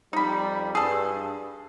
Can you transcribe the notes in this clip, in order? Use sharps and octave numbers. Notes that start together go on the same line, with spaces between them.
F2 G3 D#4 B5
G2 G#4 A4